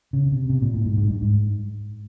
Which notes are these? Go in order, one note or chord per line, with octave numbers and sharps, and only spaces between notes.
C#3
C3
C3
A#2
A2
G#2
G#2
G2
G#2